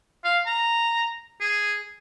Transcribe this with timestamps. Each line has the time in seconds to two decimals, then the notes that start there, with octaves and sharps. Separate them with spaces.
0.25 F5
0.47 A#5
1.41 G#4